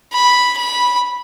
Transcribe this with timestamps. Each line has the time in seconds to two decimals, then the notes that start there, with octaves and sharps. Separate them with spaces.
0.13 B5
0.57 B5